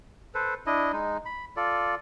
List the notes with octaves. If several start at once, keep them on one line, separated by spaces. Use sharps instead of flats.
A4 B4 C5
D4 E4 D#5
G#3 D#4
B5
F4 A4 D5